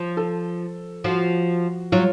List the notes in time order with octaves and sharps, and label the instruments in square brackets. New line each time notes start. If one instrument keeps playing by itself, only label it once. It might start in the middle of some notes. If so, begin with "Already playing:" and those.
Already playing: [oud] F3
[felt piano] A4
[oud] F3 [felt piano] F#4
[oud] F#3 [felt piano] F4